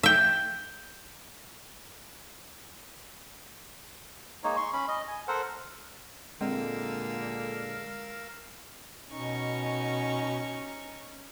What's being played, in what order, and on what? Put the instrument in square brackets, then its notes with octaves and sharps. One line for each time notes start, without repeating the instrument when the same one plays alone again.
[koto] E5 G5
[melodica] G#3 A#3 D#4 C#5
C6 C#6
C#4 B5
D#5
G#5
A4 A#4 C5 F#5
[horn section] A#2 D3 [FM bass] G#3 [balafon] C4 [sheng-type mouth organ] A#4 F5 E6
[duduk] B2 [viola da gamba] C#4 [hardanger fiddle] D#4 C#6